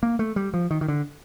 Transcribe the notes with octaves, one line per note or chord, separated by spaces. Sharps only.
A#3
A3
G3
F3
D#3
D#3
D3